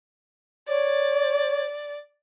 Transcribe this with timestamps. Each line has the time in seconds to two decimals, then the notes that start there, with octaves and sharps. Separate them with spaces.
0.68 C#5 D5